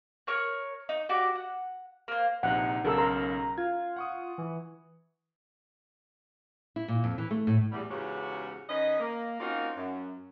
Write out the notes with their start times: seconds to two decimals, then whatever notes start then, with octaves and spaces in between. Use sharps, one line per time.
0.27 A#4 C#5 C#6 F#6
0.89 D#4
1.09 F#4 G4 D5 D6
1.35 F#5
2.08 A#3 C5
2.43 A#1 C3 D#4 F#5
2.84 B1 C#3 C#4 A4 A#4 E6
2.98 A#4 A#5 C6
3.58 F4 G#6
3.96 F#5 C#6 D#6
4.38 E3
6.76 E4
6.88 A#2
7.04 F2
7.18 E3
7.31 A3
7.47 A2
7.71 E2 G3
7.90 E2 G#2 C#3 C#4 F#4 G4
8.69 D#3 C#4 B4 D#5
9.00 A#3
9.40 A#3 C4 C#4 D#4 F4 F#4
9.77 F#2